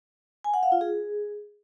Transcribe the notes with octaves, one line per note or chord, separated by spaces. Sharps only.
G#5
F#5
F5
F4
G#4